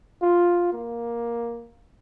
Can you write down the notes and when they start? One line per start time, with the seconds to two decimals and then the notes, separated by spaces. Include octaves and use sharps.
0.22 F4
0.73 A#3